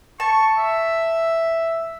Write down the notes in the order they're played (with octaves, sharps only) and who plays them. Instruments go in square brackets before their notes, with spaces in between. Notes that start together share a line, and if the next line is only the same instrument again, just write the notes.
[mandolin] A5 [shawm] C#6
[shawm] E5